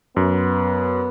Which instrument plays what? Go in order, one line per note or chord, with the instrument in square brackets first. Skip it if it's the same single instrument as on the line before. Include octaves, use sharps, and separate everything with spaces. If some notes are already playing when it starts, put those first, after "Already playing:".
[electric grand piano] F#2 [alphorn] B3